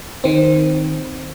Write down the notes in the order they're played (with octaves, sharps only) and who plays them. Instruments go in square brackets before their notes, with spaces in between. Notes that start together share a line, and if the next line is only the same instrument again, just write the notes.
[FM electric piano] D#3 C4